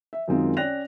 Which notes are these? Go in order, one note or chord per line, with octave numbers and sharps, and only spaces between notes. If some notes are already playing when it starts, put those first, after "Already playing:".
E5
F#2 D#3 G#3 C4 D#4 F4
C#4 D5 G5 F#6 A#6 F7